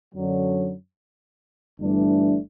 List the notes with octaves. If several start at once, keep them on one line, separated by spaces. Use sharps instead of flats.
F#2 D3 F#3
G1 G2 E3 A3 D4